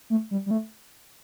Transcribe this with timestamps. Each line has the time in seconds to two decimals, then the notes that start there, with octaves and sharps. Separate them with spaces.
0.10 A3
0.31 G3
0.46 G3
0.51 A3